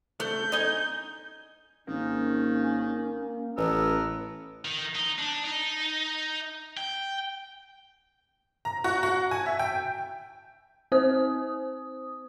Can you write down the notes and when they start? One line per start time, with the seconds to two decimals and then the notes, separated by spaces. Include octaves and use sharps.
0.20 A3 G6
0.52 D#4 G#5
1.87 G#1 D#3 A#3 C#4
3.57 A1 B3 A#4 B4 E6
4.65 D#3
4.95 D#4
5.19 D4
5.45 D#4
6.77 G5
8.65 A#5
8.84 F#4
9.03 F#4
9.31 G#5
9.46 E5
9.59 G5
10.92 C4 C5 D#6